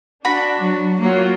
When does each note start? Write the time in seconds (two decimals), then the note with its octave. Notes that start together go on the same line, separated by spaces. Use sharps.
0.25 D4 F#4 B5
0.58 F#3
1.01 F#3 A#3 F4